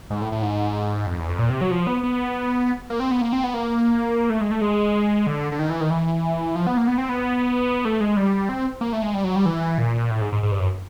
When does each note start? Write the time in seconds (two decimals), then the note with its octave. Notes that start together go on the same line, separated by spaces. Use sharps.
0.10 G#2
0.21 A2
0.32 A2
0.42 G#2
1.07 F2
1.18 E2
1.28 F2
1.39 A#2
1.50 C3
1.61 F#3
1.71 F3
1.87 B3
2.03 B3
2.90 A#3
3.00 C4
3.11 B3
3.21 A#3
3.33 C4
3.44 B3
3.54 A#3
4.30 A3
4.41 G#3
4.51 A3
4.61 G#3
5.27 D3
5.52 D3
5.59 D#3
5.70 E3
5.81 D#3
5.90 E3
6.56 F3
6.67 B3
6.77 A#3
6.87 B3
6.98 C4
7.09 B3
7.85 A3
8.01 G#3
8.17 G3
8.49 C4
8.81 A#3
8.93 A3
9.03 G#3
9.14 G3
9.24 F#3
9.36 G3
9.46 E3
9.78 A#2
10.10 A2
10.21 G#2
10.32 G#2
10.43 G#2
10.51 G2
10.59 F#2